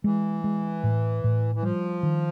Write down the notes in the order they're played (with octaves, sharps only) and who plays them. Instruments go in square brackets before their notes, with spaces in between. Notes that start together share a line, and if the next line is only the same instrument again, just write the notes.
[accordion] E3 [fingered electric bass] G#3
[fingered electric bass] G#3
A2
A2
[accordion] E3
[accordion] F3 [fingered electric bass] G3
[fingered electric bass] D#3